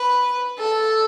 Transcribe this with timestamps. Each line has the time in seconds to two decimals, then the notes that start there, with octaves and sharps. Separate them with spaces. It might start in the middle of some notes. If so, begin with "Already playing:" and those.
Already playing: B4
0.59 A4